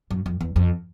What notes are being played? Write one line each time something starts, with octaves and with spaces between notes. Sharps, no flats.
F#2
F2
E2
F2